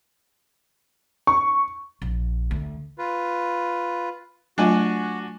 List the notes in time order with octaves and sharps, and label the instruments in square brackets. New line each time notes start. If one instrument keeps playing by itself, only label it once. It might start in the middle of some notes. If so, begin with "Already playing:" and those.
[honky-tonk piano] C#6
[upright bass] A#1
D2
[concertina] F4 B4
[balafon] F#3 A3 F4 [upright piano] D4 G#5 [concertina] F#4